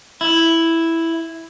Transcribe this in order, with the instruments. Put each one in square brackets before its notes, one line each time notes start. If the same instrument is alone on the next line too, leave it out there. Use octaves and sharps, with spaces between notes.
[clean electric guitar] E4